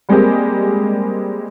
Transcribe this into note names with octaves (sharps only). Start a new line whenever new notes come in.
G3 G#3 A#3 C4 G4 G#4